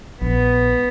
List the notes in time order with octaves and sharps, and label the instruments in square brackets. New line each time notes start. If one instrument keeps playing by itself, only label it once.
[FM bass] A#1 [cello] B3